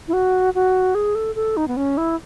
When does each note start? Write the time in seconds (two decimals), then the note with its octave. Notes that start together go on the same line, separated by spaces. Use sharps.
0.08 E4
0.13 F#4
0.55 F#4
0.95 G#4
1.15 A4
1.35 A4
1.57 D#4
1.68 B3
1.77 C#4
1.97 E4